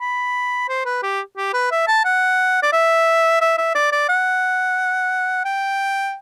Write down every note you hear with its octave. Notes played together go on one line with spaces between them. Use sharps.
B5
C5
B4
G4
G4
B4
E5
A5
F#5
D5
E5
E5
E5
D5
D5
F#5
G5